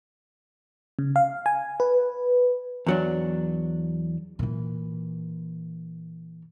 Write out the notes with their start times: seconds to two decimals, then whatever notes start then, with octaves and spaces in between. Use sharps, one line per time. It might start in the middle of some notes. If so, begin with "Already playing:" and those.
0.99 C#3
1.16 F5
1.46 G#5
1.80 B4
2.87 E2 F#3 D4
4.39 A#2 E3